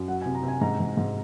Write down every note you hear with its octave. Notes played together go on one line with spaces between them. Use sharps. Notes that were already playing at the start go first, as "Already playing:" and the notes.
Already playing: F#2
F#3 F#5
G#5
C3
A#5
C3 G#5
G#2 A#5
G#2
G#2